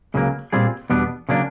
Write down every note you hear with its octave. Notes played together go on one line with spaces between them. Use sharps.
C#2 C#3 F#3 A#3
A#2 G3 C4 F4 G#4
E2 B2 G3 B3 D4
C#3 F#3 A#3 D4